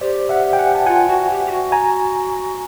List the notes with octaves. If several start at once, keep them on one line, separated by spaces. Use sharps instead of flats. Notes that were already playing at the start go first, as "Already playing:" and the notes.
G4 C5 D5
E5 F#5
G5
F#5 G#5
A5
F4 F#5 G#5
F#4
G4
G4
F#4
G#5 A#5